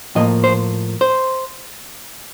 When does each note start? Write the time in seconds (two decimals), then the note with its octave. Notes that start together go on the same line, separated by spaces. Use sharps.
0.15 A2 F3 A#3 D#5
0.44 C5
1.01 C5